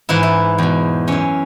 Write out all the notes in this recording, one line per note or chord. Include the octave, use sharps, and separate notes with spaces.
G#2 E3 E4
E4
E2 B2
F#2 E3 C#4